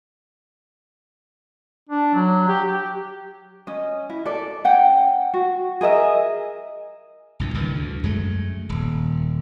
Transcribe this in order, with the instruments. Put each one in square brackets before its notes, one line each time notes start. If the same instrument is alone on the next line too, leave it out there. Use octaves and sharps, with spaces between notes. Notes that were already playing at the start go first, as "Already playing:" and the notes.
[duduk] D4
F#3
G4
G4
[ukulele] C#4 D#5
E4
A4 D5
C#4 F#5 G5
F#4
G#4 A#4 D#5 E5
[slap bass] C2 G2 A#2
C#2 G2 D#3 E3
D2
F#2 G#3 A3
D#1